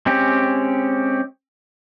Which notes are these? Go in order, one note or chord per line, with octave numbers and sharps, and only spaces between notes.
G#3 C4 C#4 G4